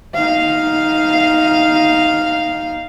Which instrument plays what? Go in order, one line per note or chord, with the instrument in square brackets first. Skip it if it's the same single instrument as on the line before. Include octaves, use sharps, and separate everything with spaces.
[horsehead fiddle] D#4 F5